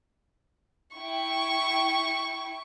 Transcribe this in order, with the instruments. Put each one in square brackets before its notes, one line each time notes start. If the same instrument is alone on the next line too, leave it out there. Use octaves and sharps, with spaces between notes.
[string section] E4 G5 [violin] C#6